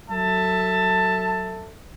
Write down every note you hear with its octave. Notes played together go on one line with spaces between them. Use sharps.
F#3 A4 E5 A5